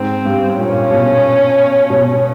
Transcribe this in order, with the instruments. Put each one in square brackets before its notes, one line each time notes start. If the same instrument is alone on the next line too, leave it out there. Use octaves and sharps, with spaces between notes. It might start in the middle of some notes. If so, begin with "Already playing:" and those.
Already playing: [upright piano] G#2 [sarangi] C4
[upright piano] G2
[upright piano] A#2 [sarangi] C#4
[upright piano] B2
B2